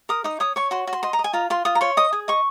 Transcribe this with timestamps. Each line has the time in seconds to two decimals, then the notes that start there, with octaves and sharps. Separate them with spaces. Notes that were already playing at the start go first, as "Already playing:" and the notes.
0.09 A#4 D#6
0.24 D#4 D#6
0.40 C#5 D#6
0.56 C#5 C#6
0.71 F#4 C6
0.87 F#4
0.93 C6
1.03 D#5 C6
1.13 A#5
1.19 D#5
1.24 G#5
1.33 F4 A#5
1.50 F4 C6
1.65 F4 D#6
1.75 A#5
1.81 C#5 C6
1.97 D#5 D#6
2.13 G#4
2.28 D#5 C#6